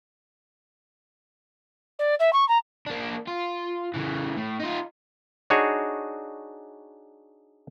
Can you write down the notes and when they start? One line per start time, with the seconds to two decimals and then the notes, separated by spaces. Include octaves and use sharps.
1.99 D5
2.19 E5
2.33 C#6
2.48 A#5
2.87 A#3 D4
3.28 F4
3.94 C#3 E3
4.37 A2
4.60 D#4 F4
5.50 D4 D#4 F#4 G#4 C#5